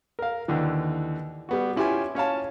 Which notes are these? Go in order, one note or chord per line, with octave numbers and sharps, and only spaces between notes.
A#4 F5
D#2 D3 E3
G3 B3 F#4
C#4 E4 F4 G4 C#5 G#5
C#4 C#5 F5 A5